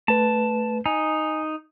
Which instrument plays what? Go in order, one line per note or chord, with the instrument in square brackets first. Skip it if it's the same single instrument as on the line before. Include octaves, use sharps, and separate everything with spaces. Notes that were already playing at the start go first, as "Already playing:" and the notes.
[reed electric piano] A3 B4 [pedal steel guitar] A5
[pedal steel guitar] D#4 [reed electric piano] G#5